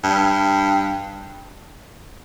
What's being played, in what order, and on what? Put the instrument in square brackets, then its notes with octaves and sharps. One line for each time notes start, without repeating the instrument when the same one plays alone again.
[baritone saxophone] G2